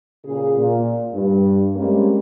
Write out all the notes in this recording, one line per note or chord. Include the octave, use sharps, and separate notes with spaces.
A#2 C#3 G#4
A#2
G2
G3 G#3 A#3 C4 C#4